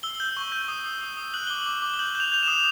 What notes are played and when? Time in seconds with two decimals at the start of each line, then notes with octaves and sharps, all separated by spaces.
0.03 E6 G7
0.20 G6
0.37 C#6
0.52 G6
0.68 D#6
0.86 D#6
1.01 D#6
1.17 D#6
1.34 F#6 F#7
1.47 D6 G7
1.62 D6 F#7
1.82 D6
1.93 G7
1.99 G6 F#7
2.15 G6 F7
2.32 G6 F7
2.43 D#6 E7